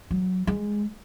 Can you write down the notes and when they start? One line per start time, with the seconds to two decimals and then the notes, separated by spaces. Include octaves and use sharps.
0.11 F#3
0.47 G#3